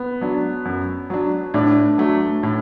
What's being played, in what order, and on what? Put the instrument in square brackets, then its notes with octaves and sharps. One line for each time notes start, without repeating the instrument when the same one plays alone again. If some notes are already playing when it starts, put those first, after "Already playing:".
Already playing: [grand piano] B3
[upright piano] F#3 D4
F#2
F#3 D4
[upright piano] A2 [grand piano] D4
[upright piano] F#3 A3
A2